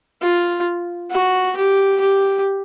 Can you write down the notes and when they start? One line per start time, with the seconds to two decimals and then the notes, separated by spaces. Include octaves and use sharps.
0.22 F4
1.11 F#4
1.56 G4
2.01 G4